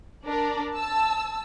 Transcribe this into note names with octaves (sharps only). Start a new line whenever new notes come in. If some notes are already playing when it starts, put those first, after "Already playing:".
D4 A#4 D5
A5 E6